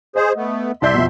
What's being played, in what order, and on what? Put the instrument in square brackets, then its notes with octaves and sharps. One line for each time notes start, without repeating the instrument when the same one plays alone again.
[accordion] G#4 C5 [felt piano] D#5
[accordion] A3 B3
[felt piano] C2 D5 G6 [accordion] E5 C6
[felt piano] F2 B2